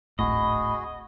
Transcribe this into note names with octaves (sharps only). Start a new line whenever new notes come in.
D1 G#1 A2 F#4 G#4 D#5 B5